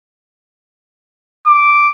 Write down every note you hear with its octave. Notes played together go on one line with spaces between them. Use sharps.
D6